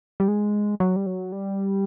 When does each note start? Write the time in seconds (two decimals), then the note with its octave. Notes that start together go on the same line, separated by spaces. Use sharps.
0.20 G3
0.28 G#3
0.80 F#3
0.96 G3
1.06 F#3
1.32 G3